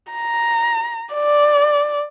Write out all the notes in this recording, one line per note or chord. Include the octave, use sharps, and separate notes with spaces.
A#5
D5